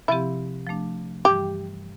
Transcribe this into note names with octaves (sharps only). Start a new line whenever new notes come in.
C3 F3 C4 E4 G4
F3 A3 D4
G2 E3 G3 G4